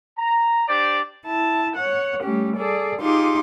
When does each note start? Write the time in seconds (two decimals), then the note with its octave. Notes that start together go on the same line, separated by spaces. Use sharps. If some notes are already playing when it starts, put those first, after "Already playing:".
0.19 A#5
0.68 D4 G4 C5 D5
1.25 E4 A5
1.76 C#5 F#5
2.23 G3 A3 C#4 G4
2.54 G#4 A4 D5
3.01 D#4 F4 G4 G#4 C6 D6